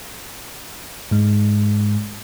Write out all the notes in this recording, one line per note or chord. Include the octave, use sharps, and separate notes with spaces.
G#2 G#3